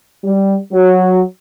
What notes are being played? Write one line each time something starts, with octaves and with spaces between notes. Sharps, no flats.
G3
F#3